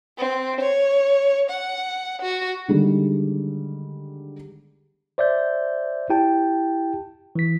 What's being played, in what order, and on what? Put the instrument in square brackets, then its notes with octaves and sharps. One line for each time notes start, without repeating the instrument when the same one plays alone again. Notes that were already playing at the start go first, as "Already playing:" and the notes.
[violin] C4
C#5
F#5
F#4
[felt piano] D3 D#3 G3 G#3
[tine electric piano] C5 D5 E5 G6
E4 G4 G5 A5
E3 B6